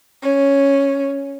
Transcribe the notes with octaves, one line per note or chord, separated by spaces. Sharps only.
C#4